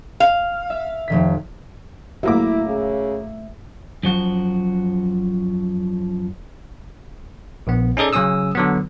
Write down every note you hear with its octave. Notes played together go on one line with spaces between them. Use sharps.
F5
E5
F1 D#3 B6
F#3 A3 A#3 E4 E5 D6
C#3
F#2 F3 F#4
A#1 B3
C#4 D#4 G#4 A4 D5
C#3 F#3 C#4 D#6 E6
D3 F#3 B3